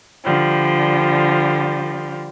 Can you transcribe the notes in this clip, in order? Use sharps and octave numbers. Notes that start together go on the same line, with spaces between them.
D3 F3 G3